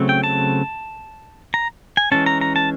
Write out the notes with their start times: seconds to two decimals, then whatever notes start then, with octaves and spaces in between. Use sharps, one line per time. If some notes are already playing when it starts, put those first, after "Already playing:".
Already playing: C#3 F#3 A3 C4
0.09 G5
0.24 A5
1.54 A#5
1.97 G#5
2.12 E3 G#3 C#4 A5
2.26 A#5
2.41 A#5
2.56 A5